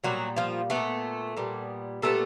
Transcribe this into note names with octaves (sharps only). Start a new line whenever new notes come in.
A#2 F#3 G3 B3 F#4
F3 F4
G3 A3 B3 A4
A#2
A#2 G3 B3
A#2 G3 A3 B3 A4